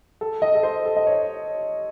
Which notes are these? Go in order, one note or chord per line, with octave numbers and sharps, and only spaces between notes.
A4
D#5
A4
C5
A4
D#5
C#5